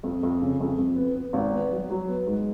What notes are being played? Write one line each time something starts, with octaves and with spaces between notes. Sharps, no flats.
F2
F2
C#3
F2
F2
B3
B3
G#1
B3
F#3
F#3
B3
G#2